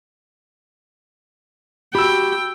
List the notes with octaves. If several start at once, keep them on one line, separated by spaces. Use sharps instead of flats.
F#4 G4 G5 B5 E6